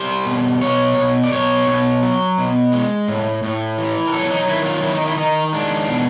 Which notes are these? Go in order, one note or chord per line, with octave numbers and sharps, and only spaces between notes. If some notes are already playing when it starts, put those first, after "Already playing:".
Already playing: G3 C5
B2
B2 C#5
B2
D5
B2 C#5
B2
F#3
B2
G#3
A2
A2
E3
A#4
F#3 A4
D#4
D#3 E4
F4
D#3 E4
D#4
E4
D#3 D#4
G#3 D4
B2